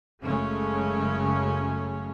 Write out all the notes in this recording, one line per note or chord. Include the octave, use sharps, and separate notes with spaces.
F#1 F#2 C#3 G#3 A3 C#4